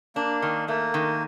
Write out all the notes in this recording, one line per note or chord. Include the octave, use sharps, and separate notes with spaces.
A#3 D4
D#3
A3 A#3
D#3